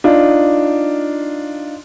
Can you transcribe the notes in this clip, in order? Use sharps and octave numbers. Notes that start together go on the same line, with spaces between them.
D4 D#4 F4